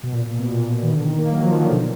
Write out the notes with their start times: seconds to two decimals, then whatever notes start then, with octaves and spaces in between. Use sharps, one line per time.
0.03 B2
0.12 A#2
0.26 A#2
0.39 B2
0.52 A#2
0.72 A#2
0.83 D#3
0.92 D3
1.04 D#3
1.18 A#3
1.32 F#3
1.41 F3
1.51 D#3
1.61 D3
1.71 B2